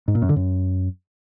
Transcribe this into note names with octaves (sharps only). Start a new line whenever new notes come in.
G#2
A#2
F#2
D3
F#2